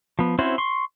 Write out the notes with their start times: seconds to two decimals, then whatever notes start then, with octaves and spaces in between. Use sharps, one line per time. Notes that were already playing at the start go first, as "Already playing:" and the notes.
0.19 F3 B3
0.39 C4 C#4 E4 F#4 C5
0.58 C6 C#6